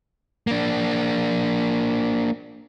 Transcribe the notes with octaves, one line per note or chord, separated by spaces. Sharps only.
A#3 D4